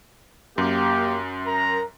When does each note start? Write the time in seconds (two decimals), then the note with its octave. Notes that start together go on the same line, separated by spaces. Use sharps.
0.58 F#2 A#3 G4
1.46 A#4 A#5